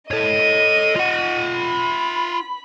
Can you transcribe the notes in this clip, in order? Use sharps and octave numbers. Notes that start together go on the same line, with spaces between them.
A4 C#5 D#5 D#7
F4 F#5
B5